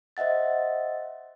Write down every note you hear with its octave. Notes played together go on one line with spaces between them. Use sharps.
C5 D#5 E5 F#5 A6